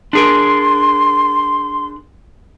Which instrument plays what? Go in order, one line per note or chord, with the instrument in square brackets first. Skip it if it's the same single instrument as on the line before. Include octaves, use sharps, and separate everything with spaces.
[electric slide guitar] D4 G#4 A#4 [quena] C6